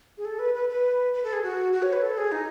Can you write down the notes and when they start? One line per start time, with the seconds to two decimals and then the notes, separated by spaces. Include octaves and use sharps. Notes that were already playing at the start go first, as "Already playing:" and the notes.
0.18 G#4
0.25 A4
0.39 B4
0.54 B4
0.69 B4
1.13 B4
1.24 A4
1.33 G#4
1.43 F#4
1.72 F#4
1.82 C#5
1.93 B4
2.02 A4
2.18 G#4
2.32 D#4